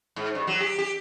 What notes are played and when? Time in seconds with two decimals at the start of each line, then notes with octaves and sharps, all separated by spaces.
0.16 G#2
0.35 G2
0.47 F#3
0.60 G4
0.78 G4